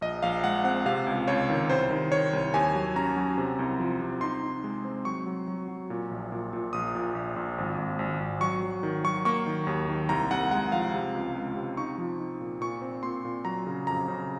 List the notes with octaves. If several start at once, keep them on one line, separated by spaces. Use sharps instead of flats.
A#1 D#5
A#1 F5
G#3 F#5
C4 F#5
C3 F5
C#2
C#2 C#5
D#3
C2 C5
D#3
D#3 C#5
C2
D#2 G#5
F#3
C#4 A#5
F#3
C3
C2
F3
C3
D#4 C6
D#4
G#3
C4
F#3 C#6
F#3
F#3
F#3
A#2
A#1
A#2
A#2
A#1 D#6
A#2
A#1
A#1
G#1
G#1
G#1
G#1
F#3 C#6
F#3
D#3
F#3 C#6
A#3 C#6
D#3
D#2
D#3
C2 A#5
C2 F#5
G#3 F#5
F3 F5
C3
C#2
C#2
C3
D#4 C#6
F3
D#4
A#2
A#2 C#6
C4
A#2 C6
A#2
F#3 A#5
C#3
F2 A#5
C#3